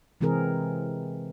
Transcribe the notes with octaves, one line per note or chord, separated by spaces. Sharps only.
C3 E3 G#3 C4 G#4 A#4